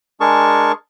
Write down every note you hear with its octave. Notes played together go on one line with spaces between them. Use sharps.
G#3 D4 G#4 A#4 A5 C#6